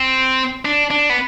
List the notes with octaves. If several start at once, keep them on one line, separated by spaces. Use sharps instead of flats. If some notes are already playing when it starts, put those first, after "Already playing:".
Already playing: C4
D4
D4
B3